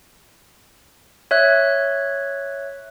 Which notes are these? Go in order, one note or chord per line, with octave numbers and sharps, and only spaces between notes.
C#5 E5 F#6